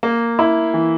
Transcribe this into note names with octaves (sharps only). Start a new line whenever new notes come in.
A#3
E4
E3